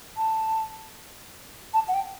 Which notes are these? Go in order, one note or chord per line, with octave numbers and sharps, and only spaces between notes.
A5
A5
F#5
G5